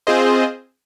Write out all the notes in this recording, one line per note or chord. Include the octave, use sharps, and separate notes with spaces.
C4 F4 G#4 C5 D#5